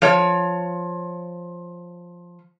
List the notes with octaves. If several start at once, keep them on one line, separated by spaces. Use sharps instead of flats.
F3 C#5